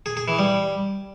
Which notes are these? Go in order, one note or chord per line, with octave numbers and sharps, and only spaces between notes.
G#4
G#4
E3
G3